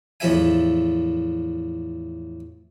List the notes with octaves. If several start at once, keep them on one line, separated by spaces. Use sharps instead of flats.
E2 A2 F3 A4 E5 G#5